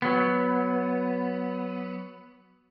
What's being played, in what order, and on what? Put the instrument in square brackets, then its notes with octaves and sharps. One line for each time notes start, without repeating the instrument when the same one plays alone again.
[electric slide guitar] F#3 B3